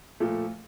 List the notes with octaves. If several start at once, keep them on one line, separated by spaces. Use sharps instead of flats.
A#2 F3 A3